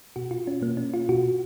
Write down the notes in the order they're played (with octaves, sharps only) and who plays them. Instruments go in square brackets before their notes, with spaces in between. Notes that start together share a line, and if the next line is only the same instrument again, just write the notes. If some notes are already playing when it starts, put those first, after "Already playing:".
[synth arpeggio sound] B2 F#4
F4
C#4
B2 A#3
C#4
F4
B2 F#4